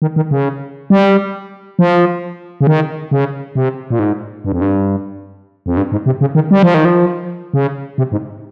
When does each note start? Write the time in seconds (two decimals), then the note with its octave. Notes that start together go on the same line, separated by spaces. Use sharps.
0.02 D#3
0.16 D#3
0.31 C#3
0.90 G3
1.79 F3
2.61 C#3
2.67 D#3
3.11 C#3
3.55 C3
3.90 A#2
3.99 G#2
4.45 G2
4.52 F2
4.61 G2
5.66 F2
5.77 G2
5.92 G#2
6.06 C3
6.21 C#3
6.35 D#3
6.51 G3
6.63 F3
6.74 D#3
6.85 F3
7.54 C#3
7.98 C3
8.12 G#2